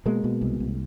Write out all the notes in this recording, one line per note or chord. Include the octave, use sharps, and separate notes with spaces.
B2 G#3 A#3
B2
C2
C2